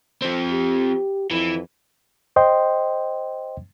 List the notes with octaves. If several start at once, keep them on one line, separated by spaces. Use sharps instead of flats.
F3 C4
G4
F2 E3
C5 D#5 G5 C6